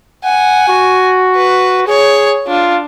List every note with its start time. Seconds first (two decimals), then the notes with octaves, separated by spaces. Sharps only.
0.25 F#5 G#5
0.68 F#4
1.36 B4
1.88 G#4 C#5
2.47 D4 F4